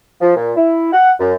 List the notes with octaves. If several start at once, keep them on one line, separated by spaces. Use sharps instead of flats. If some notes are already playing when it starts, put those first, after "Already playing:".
F3
A#2
E4
F#5
F#2